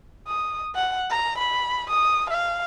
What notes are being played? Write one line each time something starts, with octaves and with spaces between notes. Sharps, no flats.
D#6
F#5
A#5
B5
D#6
F5